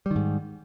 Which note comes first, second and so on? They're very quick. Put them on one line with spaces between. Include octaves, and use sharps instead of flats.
G3 D#3 G#2